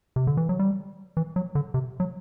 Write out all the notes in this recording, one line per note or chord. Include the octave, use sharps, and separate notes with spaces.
C3
D3
E3
F#3
G3
E3
F#3
D3
C3
F#3